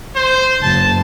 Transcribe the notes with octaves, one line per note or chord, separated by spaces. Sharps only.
C5
F#1 A5